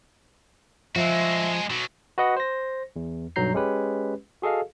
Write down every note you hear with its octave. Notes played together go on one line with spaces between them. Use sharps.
F3 G#3 F#4 E5
B2 F#3
F#4 B4 D#5 F#5
C5 A#6
E2
B1 G2 F#3 A#5 G6 C7
G#3 C#4 G4 B4
F#4 G#4 A4 D#5 F5